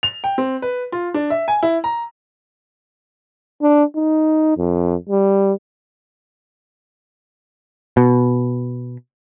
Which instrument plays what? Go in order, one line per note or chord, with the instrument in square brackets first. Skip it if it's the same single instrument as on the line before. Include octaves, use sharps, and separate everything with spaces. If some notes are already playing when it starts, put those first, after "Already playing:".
[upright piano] F7
G5
C4
B4
F4
D4
E5
G#5
E4
A#5
[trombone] D4
D#4
F2
G3
[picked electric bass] B2